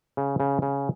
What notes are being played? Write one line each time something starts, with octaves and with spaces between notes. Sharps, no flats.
C#3
C#3
C#3